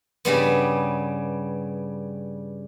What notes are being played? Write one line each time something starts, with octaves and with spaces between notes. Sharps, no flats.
G2 C#3 G3 B3